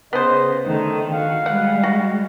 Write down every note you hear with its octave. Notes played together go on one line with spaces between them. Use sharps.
C#3 B3 C5 D#5
D3 D#3 A3 D#4
D#3 F#4 F5
G3 G#3 F#5
F#4